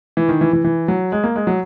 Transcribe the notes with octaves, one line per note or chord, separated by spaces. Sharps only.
E3
D#3
E3
E3
E3
F#3
G#3
A#3
G#3
F#3